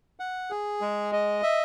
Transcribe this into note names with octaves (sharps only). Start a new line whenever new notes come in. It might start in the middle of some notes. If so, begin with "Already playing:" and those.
F#5
G#4
G#3
D#5
E5